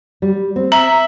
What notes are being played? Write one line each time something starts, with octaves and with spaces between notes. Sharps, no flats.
G3
C4
E5 A#5